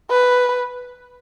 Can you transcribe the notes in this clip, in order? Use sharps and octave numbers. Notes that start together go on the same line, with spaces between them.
B4